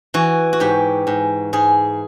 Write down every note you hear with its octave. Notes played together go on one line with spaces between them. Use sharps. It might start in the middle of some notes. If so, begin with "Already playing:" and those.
E3 F#4
F#4
G#2 G4
G#2
G#2 G#4